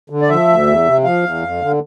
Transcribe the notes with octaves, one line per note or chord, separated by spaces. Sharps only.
D3
D5
F3 E5
D2
E2
C3
F3 F5
E2
F2
D3